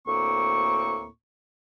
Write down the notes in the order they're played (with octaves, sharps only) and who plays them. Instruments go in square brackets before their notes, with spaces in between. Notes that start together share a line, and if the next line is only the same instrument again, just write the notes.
[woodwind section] D2 A2 A#3 C4 C#6